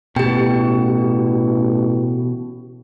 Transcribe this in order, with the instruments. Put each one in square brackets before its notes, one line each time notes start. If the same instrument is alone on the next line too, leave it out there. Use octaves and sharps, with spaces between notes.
[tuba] A1 [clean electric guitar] B2 [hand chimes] G4 G5